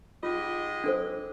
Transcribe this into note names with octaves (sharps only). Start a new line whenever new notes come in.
G#2 F4 G4 D#5
D4 A4 C5